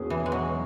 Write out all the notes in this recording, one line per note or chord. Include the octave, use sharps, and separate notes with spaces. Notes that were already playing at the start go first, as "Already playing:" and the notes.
Already playing: E2 B2 G#3 C#4 G#4
E3
G#3
F#3